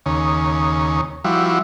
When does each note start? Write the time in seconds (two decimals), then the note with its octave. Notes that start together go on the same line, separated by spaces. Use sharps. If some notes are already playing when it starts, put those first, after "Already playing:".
0.06 D#2 C#3
1.25 F3 G3 E4 F#4